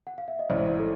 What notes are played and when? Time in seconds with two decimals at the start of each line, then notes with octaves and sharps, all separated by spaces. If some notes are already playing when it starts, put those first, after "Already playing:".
0.07 F#5
0.18 F5
0.28 E5
0.39 D#5
0.49 A1 G#2 E3 C5 D5
0.79 A4